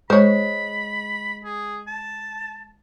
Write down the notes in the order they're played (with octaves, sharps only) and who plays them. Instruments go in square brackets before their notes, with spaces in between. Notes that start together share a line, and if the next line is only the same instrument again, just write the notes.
[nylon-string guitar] G#3 [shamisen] C5 C#5 [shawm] B5
[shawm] G#4
A5